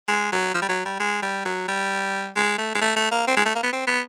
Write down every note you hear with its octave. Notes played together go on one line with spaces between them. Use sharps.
G#3
F#3
F3
G3
F#3
G3
G#3
G3
F#3
G3
G#3
A3
G#3
A3
A3
A#3
C4
G#3
A3
A#3
B3
C4
B3